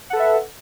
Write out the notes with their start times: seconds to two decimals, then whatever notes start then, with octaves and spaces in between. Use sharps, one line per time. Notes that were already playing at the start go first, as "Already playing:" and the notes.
0.10 F#5
0.13 A4
0.16 B4
0.20 E5